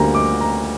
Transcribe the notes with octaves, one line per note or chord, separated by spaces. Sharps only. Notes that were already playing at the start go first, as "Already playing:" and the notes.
Already playing: D2 D3 G3 A#3 A#5
D6
A#5